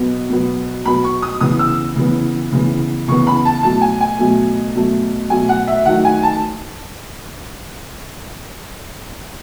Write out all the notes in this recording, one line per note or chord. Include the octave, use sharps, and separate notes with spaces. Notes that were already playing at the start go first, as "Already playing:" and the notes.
Already playing: B2 F#3 B3
B2 F#3 B3
B2 F#3 B3 B5
C#6
D#6
C#3 E3 B3 D#6
E6
C#3 E3 B3
C#3 E3 B3
C#3 E3 B3 C#6
B5
A5
B2 F#3 A3 A5
G#5
G#5
B2 F#3 A3
B2 F#3 A3
B2 F#3 A3 G#5
F#5
E5
D#3 F#3 A3 F#5
G#5
A5